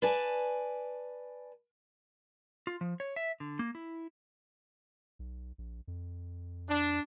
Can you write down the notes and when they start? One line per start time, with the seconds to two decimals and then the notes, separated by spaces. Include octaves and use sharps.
0.02 B4 D5 G#5 A5
2.67 F4
2.81 F3
3.00 C#5
3.16 E5
3.40 D3
3.59 A#3
3.75 E4
5.19 B1
5.58 A#1
5.88 F2
6.69 D4